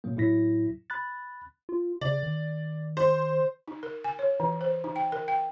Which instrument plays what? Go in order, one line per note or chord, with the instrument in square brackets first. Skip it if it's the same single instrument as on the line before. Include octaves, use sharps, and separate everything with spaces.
[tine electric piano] A#2 F#3 A#3
A2 F#3 E4 A#6 B6
B5 F#6 A6
[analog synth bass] F4
[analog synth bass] C#3 [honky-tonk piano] D5
[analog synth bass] D#3
[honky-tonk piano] C5
[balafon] D#4
A#4
G#5
C#5
E3
C5
D#4
G5
A#4
G5